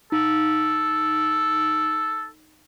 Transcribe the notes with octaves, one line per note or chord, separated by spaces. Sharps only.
D#4 A4